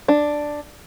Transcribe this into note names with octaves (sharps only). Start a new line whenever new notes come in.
D4